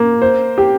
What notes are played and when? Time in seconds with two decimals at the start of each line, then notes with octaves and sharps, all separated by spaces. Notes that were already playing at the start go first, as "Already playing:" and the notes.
Already playing: A#3
0.22 C5
0.58 G4